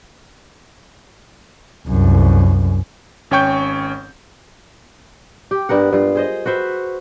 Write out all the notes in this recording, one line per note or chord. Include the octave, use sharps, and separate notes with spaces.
C2 F#2
G#1 C#4 C#5 G5 C#6 G6
G4
G2 B3 A#4 F#5
G2 F4
G#4 C5 D#5
F#4 B4 C5 E5